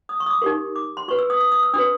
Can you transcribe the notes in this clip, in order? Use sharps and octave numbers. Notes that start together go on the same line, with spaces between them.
D#6
C#6
D#6
D6
D#4 G4 A#4 C#6
D6
C6
F#4 B4 C#6
E6
D#6
D#6
D#6
E6
D4 F#4 B4 D#6